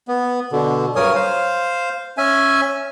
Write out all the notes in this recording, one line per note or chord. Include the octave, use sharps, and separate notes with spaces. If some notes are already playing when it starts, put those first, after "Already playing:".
B3
B2 D3
G2 F#3 A#4 C#5 G#5 D#6
C5 F5
C#4 E5 G#5